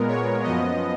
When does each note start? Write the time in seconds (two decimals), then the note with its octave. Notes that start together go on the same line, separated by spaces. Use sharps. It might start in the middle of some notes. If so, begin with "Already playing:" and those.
Already playing: A#2 G#3 B3 A#4
0.08 C#5
0.43 F#2 F3 B3 D#5